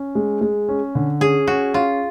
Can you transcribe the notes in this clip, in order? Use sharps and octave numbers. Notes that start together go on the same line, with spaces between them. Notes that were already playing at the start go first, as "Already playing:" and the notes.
Already playing: C#4
G#3
G#3
C#4
D3
C#4 G#4
C#4 F#4
C#4 F4